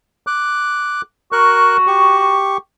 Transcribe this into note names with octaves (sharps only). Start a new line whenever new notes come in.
D6 F#6
F#4 A#4 C#6 F#6
G4 C#6